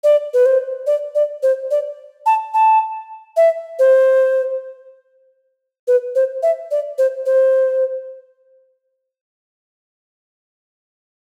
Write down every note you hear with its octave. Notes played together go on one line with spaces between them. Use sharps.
D5
B4
C5
D5
D5
C5
D5
A5
A5
E5
C5
B4
C5
E5
D5
C5
C5